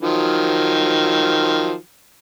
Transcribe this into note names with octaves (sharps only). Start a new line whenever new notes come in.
D#3 F3 F#3